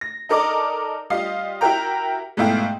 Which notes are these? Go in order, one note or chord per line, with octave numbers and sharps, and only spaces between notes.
A#6
D#4 A4 A#4 D5 D#5 D6
G3 F4 D#5 F5 C7
E4 F#4 G4 A#4 G5 A#5
G#2 B2 A3 E4 F5 G5